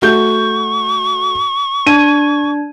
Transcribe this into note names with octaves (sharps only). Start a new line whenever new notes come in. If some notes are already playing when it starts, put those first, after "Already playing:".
A3 F#4 C#6 G6
D4 G#6 D#7